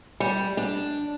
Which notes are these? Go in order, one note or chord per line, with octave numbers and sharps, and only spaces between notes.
G3
D4